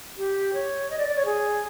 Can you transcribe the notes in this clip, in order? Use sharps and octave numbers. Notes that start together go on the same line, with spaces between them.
G4
C#5
D#5
D5
D5
C#5
G#4